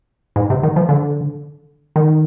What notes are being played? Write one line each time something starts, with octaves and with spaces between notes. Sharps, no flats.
G#2
C3
D#3
F3
D3
D#3